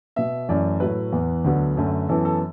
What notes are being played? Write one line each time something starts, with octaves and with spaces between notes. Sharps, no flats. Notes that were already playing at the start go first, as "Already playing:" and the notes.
B2 B3 E5
F#2 E3 A3 D5
A2 F#3 A3 B4
E2 E3 B3
D2 D3 F#3 B3
F#2 D3 A3
F#2 E3 B3 A4
A4